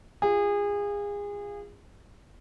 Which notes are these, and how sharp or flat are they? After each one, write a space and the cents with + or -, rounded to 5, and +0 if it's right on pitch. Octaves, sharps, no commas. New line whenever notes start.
F4 +0 G#4 -30